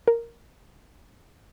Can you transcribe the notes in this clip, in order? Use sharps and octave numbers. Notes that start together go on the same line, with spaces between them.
A#4